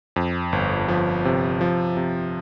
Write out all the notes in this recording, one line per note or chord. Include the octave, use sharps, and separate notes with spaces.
F2
G1
F3
C3
F3
C3